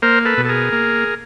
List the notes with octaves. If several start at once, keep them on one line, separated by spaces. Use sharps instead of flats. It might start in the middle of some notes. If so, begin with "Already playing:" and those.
A#3 A#4 C5
A4 B4
B2
A4
G#4 A#4
A#3